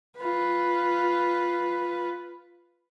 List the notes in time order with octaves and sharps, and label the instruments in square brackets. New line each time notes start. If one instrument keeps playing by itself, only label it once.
[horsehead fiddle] F4 B4